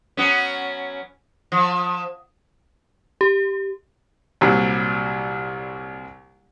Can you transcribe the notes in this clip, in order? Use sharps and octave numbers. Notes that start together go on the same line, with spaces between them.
F#3 B3 C#4
F3
G4
C2 A#2 F#3 G3